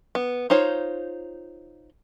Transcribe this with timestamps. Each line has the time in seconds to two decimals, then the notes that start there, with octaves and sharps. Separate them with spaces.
0.15 B3
0.50 D#4 F4 C5 C#5